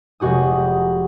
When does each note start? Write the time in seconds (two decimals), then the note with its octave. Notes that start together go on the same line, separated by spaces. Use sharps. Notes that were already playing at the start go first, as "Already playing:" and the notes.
0.20 F1 G#3 F#4 G4 D#6